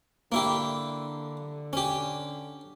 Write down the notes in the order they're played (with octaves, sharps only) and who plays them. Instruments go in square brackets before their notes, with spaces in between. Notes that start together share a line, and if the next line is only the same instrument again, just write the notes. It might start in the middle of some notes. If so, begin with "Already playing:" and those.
[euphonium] D3 [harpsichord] A#3 E4 G4
[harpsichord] C#4 G4